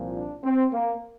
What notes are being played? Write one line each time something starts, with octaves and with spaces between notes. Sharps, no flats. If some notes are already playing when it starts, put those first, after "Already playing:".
Already playing: C2 A#2 F3
D4
C4
A#3